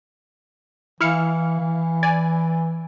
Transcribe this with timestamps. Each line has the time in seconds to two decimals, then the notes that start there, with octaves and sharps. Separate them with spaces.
1.00 E3 E4 F5 C#7
1.60 E3
2.03 D5 G#5